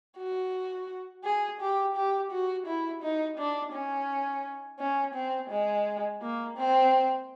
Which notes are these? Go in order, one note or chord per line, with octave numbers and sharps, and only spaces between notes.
F#4
G#4
G4
G4
F#4
E4
D#4
D4
C#4
C#4
C4
G#3
A#3
C4